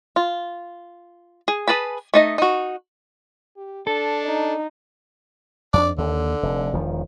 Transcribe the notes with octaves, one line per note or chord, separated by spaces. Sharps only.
F4
G#4
G#4 B4 A5 B5
A3 D#4 D#5
D#4 F#4
G4
D4 A4
D#4
F2 D4 D5
D#2 D3
F1
E1 D#3 F3